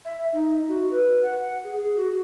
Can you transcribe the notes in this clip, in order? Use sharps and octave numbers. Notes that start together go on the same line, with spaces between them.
E5
D#4
F#4
B4
F#5
G#4
G#4
F#4